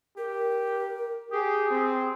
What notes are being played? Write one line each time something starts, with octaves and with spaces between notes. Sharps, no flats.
G4 A#4
G4 G#4 D#6
C4